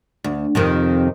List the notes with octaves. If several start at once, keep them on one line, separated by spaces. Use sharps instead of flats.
D2
F2 C3 D#3